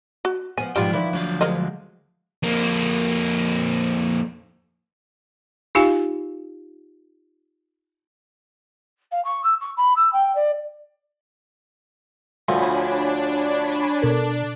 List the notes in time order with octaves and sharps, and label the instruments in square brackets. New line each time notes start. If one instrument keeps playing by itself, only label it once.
[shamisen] F#4
[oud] F3 B3 [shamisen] G#5
[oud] G#2 B2 [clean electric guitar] F3 G5 [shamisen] G3 F4
[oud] D#3 B4 D5 [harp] F3 [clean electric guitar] E4
[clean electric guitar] D2 F#3 F5 [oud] D4
[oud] D3 G#3 [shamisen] A#4 C5 D#5
[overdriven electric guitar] F2 A#3
[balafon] D#4 F4 G4 F5 G#5
[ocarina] F5
C#6
E6
C#6
B5
E6
G5
D5
[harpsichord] D2 F3 [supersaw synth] D4 [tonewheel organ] C#5 G#5 B5
[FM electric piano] B2 A4 A#4